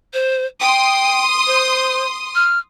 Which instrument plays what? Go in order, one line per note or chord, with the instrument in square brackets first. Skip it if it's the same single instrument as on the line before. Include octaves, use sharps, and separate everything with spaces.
[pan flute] C5
[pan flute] G5 [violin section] C6 D#6
[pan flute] C5
F6